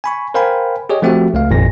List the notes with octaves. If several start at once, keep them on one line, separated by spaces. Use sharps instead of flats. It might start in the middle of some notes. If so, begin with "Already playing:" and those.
G#5 B5 C#6
A#4 C5 F5 G5 G#5 B5
G4 G#4 C#5 D#5
F3 A3 C4 F#4 G4 E5
C#2 A3 F5
G#1 F2 A#2 D#3 A#6